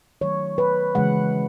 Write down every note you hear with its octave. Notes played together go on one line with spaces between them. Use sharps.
D#3 F#3 A3 C#5
B4
C#3 E3 G#3 F#5